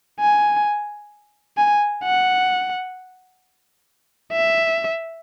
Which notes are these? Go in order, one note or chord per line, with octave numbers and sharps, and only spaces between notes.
G#5
G#5
F#5
E5